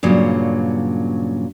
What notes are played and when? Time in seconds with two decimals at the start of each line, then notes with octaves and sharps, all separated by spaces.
0.03 G2 A#2 C#3 F#3